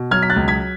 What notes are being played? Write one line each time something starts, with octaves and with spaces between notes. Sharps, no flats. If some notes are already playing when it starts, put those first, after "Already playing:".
Already playing: B2
F#3 F6 G#6
B6
F#6 A6
C#2
G#6 B6